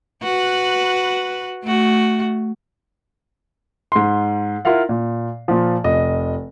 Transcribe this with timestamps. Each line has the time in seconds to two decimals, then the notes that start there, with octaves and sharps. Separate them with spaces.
0.23 F#4 B4
1.63 A3 F#4
3.92 G#2 C6
4.65 E4 F4 A#4 F5 F#5
4.89 A#2
5.48 A#2 F3
5.84 F1 D#5